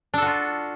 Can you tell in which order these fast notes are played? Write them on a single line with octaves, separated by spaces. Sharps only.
D4 A4 F#4 F4